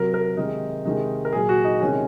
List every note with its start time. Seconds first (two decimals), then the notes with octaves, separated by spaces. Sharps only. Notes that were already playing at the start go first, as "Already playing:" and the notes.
Already playing: C3 F#3 A#4
0.14 A#4
0.37 C3 D#3 G#3 D#4
0.85 C3 D#3 G#3 D#4
1.25 A#4
1.33 A#2 F#3 G#4
1.49 F#4
1.64 D#4
1.81 C3 D#3 G#3 C#4